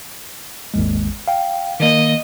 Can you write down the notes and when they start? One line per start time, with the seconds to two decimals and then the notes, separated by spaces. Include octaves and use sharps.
0.74 G#1 D#2 G#3
1.28 F5 G5
1.80 D#3 A#3 D#5